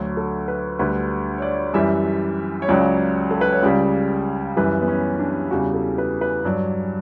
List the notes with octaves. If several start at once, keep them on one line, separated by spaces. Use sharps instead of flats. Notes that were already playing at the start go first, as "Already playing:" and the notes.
Already playing: D2 D3 F#3
A4
B4
D2 D3 G3 B4
C#5
D5
F#2 E3 G3 E5
C#5
C#2 C#3 F#3 D5
A4
B4
C#5
C#2 C#3 G3 D5
F#2 E3 G3 B4
B3
C#4
D4
E2 C#3 G3 F#4
A4
B4
B4
G2 F#3 D5